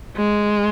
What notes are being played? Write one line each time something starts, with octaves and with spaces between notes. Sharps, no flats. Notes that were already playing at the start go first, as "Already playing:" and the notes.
G#3